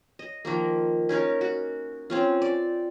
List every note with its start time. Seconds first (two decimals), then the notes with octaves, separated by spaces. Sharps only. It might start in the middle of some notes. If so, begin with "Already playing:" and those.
0.19 D#5
0.45 D#3 F3 A#3
1.09 C#4 D#4 A#4 C#5
1.41 F#4
2.10 C4 C#4 F4
2.42 D5